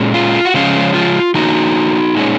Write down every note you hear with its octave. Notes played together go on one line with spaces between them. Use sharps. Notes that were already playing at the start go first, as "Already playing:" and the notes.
Already playing: A#2 G#3 C#4
F4
F#4
C#3 F3 G#3 C#4 F4
F4
D#3 A#3 C#4 D#4 F#4
A#2 G#3 C#4